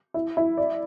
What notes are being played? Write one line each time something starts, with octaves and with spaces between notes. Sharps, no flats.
E4
E4
D5